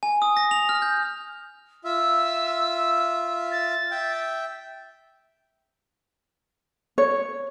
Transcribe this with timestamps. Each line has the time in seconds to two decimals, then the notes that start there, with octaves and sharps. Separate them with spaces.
0.03 G#5
0.22 D#6
0.37 A#6
0.51 F7
0.69 F6
0.82 G6
1.84 F4 E5 E6
3.52 A6
3.91 E5 G5
6.98 C#5